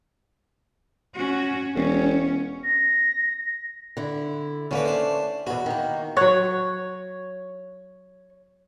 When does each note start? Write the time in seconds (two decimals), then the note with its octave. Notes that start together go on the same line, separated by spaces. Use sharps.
1.14 C#4 F#4
1.75 E1 C#4
2.63 A#6
3.97 D3 E4
4.71 D3 A3 A#3 C#4 B4
4.86 D4 C5
5.47 E2 B2 F#4
5.66 D#3 A#3
6.17 F#3 C#5 F#5